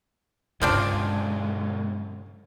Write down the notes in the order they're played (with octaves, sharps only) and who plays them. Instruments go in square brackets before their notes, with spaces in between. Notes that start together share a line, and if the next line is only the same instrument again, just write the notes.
[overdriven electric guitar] B1 G#3 [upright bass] G2 C#3 [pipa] F3 C4 D4